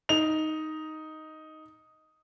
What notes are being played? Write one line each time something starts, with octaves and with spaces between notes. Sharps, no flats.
D#4 F7